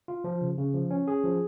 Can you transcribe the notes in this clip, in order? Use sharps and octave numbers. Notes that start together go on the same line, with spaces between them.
F4
F3
C#3
C#3
F3
C#4
G#4
F3